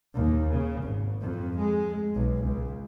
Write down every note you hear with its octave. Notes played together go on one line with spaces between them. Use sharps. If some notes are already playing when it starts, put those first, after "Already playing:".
D#2
C#3
G#1
F2
G#3
B1
C#2